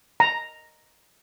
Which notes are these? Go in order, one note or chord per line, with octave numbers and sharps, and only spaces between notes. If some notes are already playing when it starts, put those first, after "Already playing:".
A#5